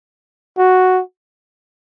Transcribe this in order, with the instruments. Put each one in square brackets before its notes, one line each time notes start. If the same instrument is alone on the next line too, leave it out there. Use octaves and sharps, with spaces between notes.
[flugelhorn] F#4